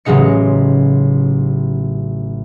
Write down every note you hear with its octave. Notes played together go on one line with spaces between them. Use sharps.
A1 C#3 F#3 G#3 D#4 C#7